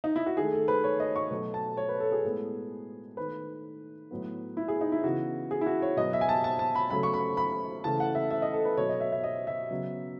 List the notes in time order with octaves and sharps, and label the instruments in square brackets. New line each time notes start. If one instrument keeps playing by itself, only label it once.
[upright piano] D#4
E4
F#4
D#3 A3 G#4
A4
B4
C#5
D#5
C#6
B2 F#3 A3
A5
C#5
B4
A4
G#4
A2 G#3 B3
D#3 A3 B4
A2 F#3 B3
E4
G#4
D#4
E4
C#3 E3 B3 F#4
G#4
E4
F#4
C#5
B2 F#3 B3 D#5
E5
G#5
A5
A5
A5
B5
C#3 F#3 A3 B5
C#6
B5
B5
C#3 E3 A3 A5
F#5
E5
E5
D#5
A4
B4
B2 F#3 B3 C#5
D#5
E5
E5
D#5
E5
C#3 F#3 B3